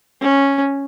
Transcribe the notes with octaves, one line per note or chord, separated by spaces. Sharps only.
C#4